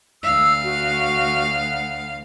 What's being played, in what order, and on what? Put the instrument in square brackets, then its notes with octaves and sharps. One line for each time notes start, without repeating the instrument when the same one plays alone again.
[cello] D2 F5 [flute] E6
[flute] F#4
F#5